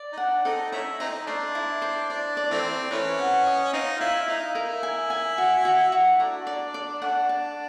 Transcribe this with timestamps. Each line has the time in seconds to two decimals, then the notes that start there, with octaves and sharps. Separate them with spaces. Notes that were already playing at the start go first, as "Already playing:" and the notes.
Already playing: D5
0.12 D#4
0.17 D4 F#5
0.45 C4 D#4 A4
0.72 A3 C#4 E4 A#5
1.00 C4 D#4 A#5
1.27 A3 D4 C5
1.55 E4
1.82 C5
2.09 D4 D5
2.37 D5
2.50 E3 A3 C4
2.64 A#5
2.91 E3 A3 C#4 B4
3.19 F#5
3.46 D#5
3.73 C4 D#4 F5
3.96 F4
4.00 E4 F5
4.28 D#4 F5
4.55 E4 A#4
4.83 G#5
5.10 G#5
5.38 F#4
5.65 F#4
5.92 F#4
6.19 A3 D4 A#5
6.47 D5
6.74 D5
7.02 A3 D4 F#5
7.29 A5